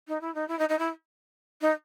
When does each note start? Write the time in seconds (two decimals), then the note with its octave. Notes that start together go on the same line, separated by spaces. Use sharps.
0.08 D#4
0.21 E4
0.35 D#4
0.48 E4
0.59 D#4
0.69 D#4
0.79 E4
1.61 D#4